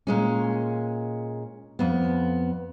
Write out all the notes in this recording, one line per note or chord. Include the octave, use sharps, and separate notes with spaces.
A#2 G#3 C#4
F2 B3